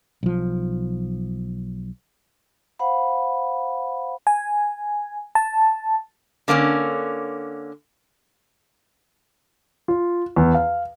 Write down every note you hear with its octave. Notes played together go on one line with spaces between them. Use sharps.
B1 F3
C5 F5 F#5 B5
G#5
A5
D3 A#3 C4 C#4
F4
E2
F5